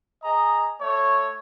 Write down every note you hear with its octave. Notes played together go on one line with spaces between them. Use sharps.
G#4 D#5 A#5
A3 C#5